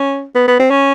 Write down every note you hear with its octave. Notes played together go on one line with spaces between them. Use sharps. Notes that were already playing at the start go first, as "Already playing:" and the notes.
Already playing: C#4
B3
B3
C4
C#4